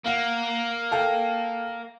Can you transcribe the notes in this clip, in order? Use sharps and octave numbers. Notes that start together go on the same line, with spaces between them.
A#3 F5 F#5
A4 F5 G5